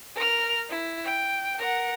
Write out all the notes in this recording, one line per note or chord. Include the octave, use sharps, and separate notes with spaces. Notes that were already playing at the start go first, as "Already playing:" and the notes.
A#4 F6
E4
G5
A#4 F#5